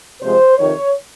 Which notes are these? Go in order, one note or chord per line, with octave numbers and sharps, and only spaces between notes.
C3 F3 G#3 C5
F2 C3 D#3 C#5